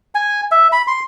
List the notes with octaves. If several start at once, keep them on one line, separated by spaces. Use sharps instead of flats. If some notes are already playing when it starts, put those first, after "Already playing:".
G#5
E5
B5
C6